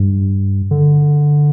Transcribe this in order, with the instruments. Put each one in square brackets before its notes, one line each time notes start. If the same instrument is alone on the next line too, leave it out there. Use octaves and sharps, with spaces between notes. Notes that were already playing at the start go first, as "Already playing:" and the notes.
Already playing: [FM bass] G2
[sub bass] D3